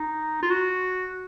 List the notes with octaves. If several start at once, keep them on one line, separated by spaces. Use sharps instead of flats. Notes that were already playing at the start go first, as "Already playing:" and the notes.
Already playing: D#4
F4
F#4